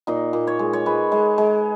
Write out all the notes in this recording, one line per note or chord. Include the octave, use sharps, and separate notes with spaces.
A#2 D#4
A#2
C#5
G#3
C#5
G#3 B4
G#3
G#3